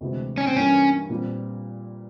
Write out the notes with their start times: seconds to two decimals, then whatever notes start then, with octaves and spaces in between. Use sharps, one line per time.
0.01 D2 C3 E3 G#3 C4
0.38 C#4
0.47 C4
0.56 G2 E3 G3 A#3 C#4
1.09 A#2 G3 C4